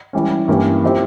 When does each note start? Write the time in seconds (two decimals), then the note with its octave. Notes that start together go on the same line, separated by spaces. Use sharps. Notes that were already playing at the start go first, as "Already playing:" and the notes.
0.13 E3 G3 C#4
0.48 G2 E3 A#3 C#4 G4
0.84 F3 C4 E4 G4